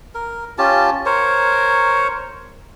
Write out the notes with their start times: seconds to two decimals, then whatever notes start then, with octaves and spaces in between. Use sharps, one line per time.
0.15 A#4
0.58 C#4 F4 G4 A5
1.06 A#4 C5 C#5